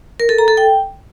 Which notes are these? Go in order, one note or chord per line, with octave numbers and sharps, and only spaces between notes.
A#4
A4
A#5
A4
G5